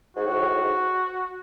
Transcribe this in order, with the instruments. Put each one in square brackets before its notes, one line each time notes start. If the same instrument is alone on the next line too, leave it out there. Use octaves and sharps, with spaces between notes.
[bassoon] G#2 [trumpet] F#4
[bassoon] A2
G#2
A2
G#2
A2
G#2